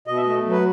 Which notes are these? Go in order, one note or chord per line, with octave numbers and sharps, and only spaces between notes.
B2 D#5
E5
D#5
A3
F#3
B4